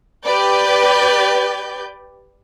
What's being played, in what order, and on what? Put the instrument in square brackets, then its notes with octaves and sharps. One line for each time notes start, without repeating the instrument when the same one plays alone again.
[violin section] G4 B4 D5 G6